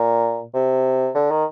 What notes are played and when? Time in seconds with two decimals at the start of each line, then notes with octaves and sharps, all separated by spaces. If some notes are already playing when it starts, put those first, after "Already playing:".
Already playing: A#2
0.54 C3
1.15 D3
1.31 D#3